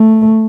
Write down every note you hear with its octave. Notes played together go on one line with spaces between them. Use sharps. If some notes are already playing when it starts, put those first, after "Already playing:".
Already playing: A3